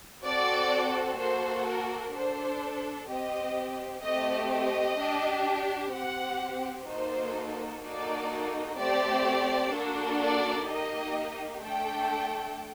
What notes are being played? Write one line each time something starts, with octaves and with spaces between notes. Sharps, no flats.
C4 F#4 A4 D5
A#3 F#4 A4 C5
A#4
D4 A4 C5
C4 G4 D#5
A3 C4 G4 D#5
D#5
D4 G4
C4 G4 F#5
A#3 D#4 F#4 A4 C5
A#3 D#4 F#4 A4 D5
A3 C4 G4 D5
A#3 D4 F#4 A4
D5
A#3 D#4 G4 D#5
A3 D4 A4 G5